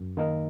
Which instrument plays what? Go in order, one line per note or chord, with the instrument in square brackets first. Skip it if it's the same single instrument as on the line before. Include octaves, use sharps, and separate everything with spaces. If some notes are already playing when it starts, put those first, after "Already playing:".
Already playing: [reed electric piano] F#2
D#3 A#3 D#4 A#4